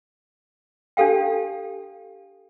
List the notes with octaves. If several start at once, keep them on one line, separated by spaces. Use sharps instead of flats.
D4 G4 A4 F5 G5